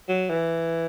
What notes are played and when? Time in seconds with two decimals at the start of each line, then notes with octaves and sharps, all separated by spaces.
0.09 F#3
0.30 E3